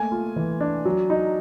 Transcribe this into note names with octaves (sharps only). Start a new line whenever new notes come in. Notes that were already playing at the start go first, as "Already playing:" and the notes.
Already playing: A3 A#3 G#5
F4
E3
D4
F#3
D#4